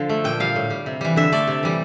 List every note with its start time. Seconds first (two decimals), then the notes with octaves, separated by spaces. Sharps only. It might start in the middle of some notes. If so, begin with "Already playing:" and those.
Already playing: D3 F3 F5
0.09 A3
0.24 A#2 G5
0.40 G3 F5
0.55 A2
0.70 G3
0.86 C3
1.01 E3 G3
1.16 D3 E5
1.32 A3 D5
1.47 C3
1.63 E3 G3